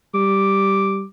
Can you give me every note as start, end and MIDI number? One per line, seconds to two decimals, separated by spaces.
0.15 1.04 55
0.15 1.04 86